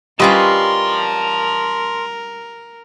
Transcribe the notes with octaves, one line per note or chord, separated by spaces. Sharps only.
G3 C#4 F4 A#4 B4 D#5 A5 C6